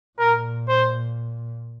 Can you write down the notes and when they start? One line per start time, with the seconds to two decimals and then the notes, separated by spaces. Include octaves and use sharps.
0.19 A#2 A#4
0.68 C5